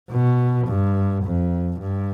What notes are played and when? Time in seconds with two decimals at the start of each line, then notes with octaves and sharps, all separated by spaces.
0.11 B2
0.67 G2
1.24 F2
1.80 G2